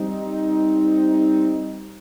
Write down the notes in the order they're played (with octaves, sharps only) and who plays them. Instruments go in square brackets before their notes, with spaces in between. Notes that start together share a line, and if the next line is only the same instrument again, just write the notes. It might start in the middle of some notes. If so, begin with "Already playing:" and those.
Already playing: [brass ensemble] G3 C4 D#4